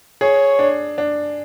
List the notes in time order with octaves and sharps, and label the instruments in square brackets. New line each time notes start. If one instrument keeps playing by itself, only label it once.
[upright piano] G#4 [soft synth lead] C#5
[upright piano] D4
D4